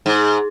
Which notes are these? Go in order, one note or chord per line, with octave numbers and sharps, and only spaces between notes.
G#2